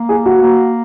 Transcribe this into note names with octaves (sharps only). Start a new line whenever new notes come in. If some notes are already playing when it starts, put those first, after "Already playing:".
Already playing: A#3
G#4
F#4
A#3